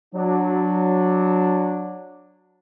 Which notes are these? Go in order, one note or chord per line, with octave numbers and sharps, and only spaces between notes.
F#3 D4